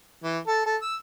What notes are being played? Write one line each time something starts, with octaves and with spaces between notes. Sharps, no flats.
E3
A4
A4
E6